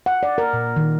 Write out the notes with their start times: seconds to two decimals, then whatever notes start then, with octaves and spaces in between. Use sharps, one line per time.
0.06 F#5
0.23 D5
0.38 A#4
0.53 A#2
0.76 D#3